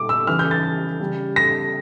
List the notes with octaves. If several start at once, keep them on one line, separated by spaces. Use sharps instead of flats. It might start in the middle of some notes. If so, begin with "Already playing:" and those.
Already playing: A#2 G3 D6
E6
C#3 E3 G3 F6
G6
A6
C#3 G3
A#6